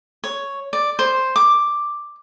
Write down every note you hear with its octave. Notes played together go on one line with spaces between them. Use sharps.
C#5
D5
C5
D6